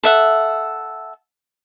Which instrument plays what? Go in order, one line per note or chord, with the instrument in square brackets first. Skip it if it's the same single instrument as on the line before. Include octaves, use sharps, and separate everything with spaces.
[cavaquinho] A4 E5 F#5